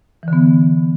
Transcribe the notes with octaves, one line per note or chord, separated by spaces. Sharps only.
D3 E3 B3